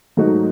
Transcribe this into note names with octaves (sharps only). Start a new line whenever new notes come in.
G#2 F#3 A3 D#4 F#4